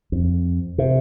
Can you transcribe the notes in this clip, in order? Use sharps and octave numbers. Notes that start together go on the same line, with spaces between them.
F2
C3